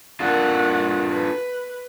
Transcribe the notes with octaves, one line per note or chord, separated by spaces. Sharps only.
D4 F4 A4 A#4 F#5
B4